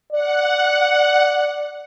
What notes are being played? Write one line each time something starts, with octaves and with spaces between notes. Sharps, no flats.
D5 F#5